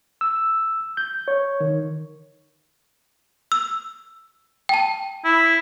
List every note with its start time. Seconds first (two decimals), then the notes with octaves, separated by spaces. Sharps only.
0.21 E6
0.97 G6
1.28 C#5
1.60 D#3
3.52 E6
4.69 G5 A5
5.25 E4